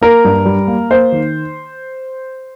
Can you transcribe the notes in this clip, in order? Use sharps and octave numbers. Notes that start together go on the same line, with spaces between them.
A#3 A#4
G2
G3
A#3
A#3 C5
D#3